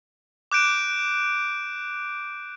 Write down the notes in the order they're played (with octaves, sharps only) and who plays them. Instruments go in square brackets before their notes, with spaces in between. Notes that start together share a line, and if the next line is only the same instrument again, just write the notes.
[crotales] D6 F#6 G6 D7 E7